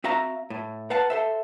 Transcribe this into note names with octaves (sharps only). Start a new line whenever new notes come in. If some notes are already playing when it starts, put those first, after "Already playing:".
C4 F#4 E5 F5 A#5
A2
B4 F5 F#5 A5
A4 C5 E5